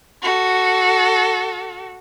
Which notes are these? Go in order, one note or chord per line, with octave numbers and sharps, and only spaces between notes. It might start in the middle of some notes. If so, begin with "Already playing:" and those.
F#4 A4